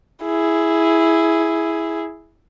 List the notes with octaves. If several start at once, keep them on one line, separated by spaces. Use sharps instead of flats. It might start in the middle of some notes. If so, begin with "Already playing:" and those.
E4 G#4